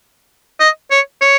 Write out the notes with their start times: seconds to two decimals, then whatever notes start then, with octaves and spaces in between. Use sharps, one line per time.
0.60 D#5
0.91 C#5
1.22 C#5